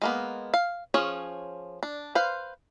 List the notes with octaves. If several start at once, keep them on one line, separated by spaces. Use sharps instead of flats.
G#3 A#3 B3
F5
F3 C#4 G#4 C#5
D4
B4 C5 F5